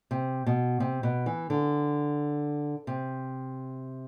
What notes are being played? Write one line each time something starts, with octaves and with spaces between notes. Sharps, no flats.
C3
B2
C3
B2
E3
D3
C3